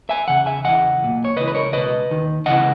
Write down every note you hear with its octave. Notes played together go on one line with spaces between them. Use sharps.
E5 G#5
E2 C#3 F#5
E5 G#5
E2 C#3 E3 D#5 F#5
B1 A#2
C#5
C#2 C#3 E3 B4 D#5
B4
A#4 C#5
C#2 B2 B4 D#5
D#2 D#3
C#2 C#3 E3 D#5 F#5